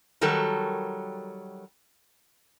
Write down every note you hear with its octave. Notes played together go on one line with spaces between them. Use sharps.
D#3 F#3 G3 F#4 A4 A#4